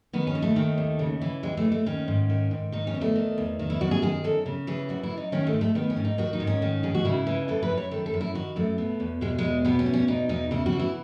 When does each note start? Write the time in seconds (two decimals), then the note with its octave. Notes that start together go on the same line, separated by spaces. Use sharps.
0.13 D#3 B3
0.27 C#4
0.35 D#2
0.42 A3
0.56 D#3
0.78 D#2
0.99 C#3
1.21 E3
1.43 D#2 G#3
1.57 A3
1.65 D#2
1.72 A3
1.86 D#3 C#4
2.08 G#2
2.30 D#3
2.51 G#2
2.72 D#3 D#4
2.87 C#4
2.94 E2
3.01 A3
3.16 D#3
3.38 E2
3.59 D#3
3.70 E4
3.81 F#2 F#4
3.91 G#4
4.02 D#3 G#4
4.24 F#2 A4
4.46 C#3
4.67 E3 G#4
4.89 F#2 F#4
5.03 E4
5.10 F#2
5.17 D#4
5.32 D#3 C#4
5.47 A3
5.53 G#2
5.61 A3
5.75 D#3 B3
5.90 C#4
5.97 G#2
6.05 D#4
6.18 D#3 F#4
6.33 D#4
6.40 G#2
6.47 C#4
6.62 D#3
6.83 G#2 G#4
6.94 F#4
7.05 C#3 E4
7.27 E3
7.48 F#2 A4
7.63 B4
7.70 F#2
7.77 C#5
7.91 D#3 A4
8.06 A4
8.13 F#2
8.21 E4
8.35 D#3 F#4
8.56 F#2 A3
8.78 B2
9.00 E2
9.21 B2 G#3
9.38 E2 G#3
9.65 B2 B3
9.79 C#4
9.86 E2
9.93 C#4
10.08 B2 D#4
10.29 E2 D#4
10.51 C#3 E4
10.66 F#4
10.72 E3
10.79 E4